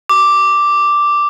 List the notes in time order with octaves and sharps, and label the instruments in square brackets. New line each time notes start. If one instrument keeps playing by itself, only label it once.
[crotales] D6